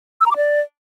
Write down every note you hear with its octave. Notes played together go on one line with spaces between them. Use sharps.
E6
A#5
D6
D5